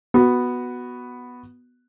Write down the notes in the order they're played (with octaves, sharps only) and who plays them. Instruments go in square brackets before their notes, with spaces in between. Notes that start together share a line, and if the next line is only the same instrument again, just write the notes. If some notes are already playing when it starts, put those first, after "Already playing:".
[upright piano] B3 F#4